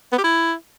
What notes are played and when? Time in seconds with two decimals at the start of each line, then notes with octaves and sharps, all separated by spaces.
0.12 B3
0.18 G4
0.24 E4